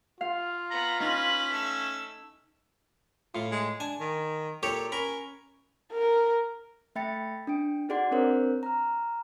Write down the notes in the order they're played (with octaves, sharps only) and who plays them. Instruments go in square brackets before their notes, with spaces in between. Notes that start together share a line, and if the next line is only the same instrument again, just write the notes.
[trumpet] F4 [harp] F5
[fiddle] B3 [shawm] A#5
[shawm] C#4 [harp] D#4 [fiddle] B4 B5
[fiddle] A3 E6
[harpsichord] A2 [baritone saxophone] F4
[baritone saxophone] G#3
[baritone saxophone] D4 [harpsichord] G#5
[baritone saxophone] D#3
[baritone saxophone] A#2 [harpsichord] G4 A4 C#5
[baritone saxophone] C#4 [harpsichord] A#4 B5
[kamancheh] A#4
[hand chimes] A3 E5 G5 B5 A6 C#7
D4 G5 D7
D#4 F#4 G#4 D5 F#5 C6
C4 D4 A#4 C5 C#5
A#5 F6